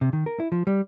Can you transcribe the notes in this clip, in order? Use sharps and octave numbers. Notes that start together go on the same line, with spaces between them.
C3
D#3
A#4
E4
F3
G3